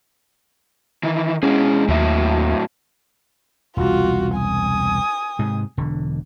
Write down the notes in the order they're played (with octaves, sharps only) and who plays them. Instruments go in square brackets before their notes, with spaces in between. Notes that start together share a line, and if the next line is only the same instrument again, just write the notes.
[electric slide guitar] D#3 E3
[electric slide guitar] G#3 E4 G#4 [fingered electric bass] C#4
[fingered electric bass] D#2 [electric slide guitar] A2 F#3 E5
[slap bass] E1 C2 [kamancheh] F4 F#4
[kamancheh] G#5 D#6
[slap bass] G#2 C3 G#3
E1 D3